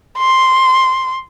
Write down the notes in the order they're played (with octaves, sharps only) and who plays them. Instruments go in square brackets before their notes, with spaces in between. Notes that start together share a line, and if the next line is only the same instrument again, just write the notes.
[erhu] C6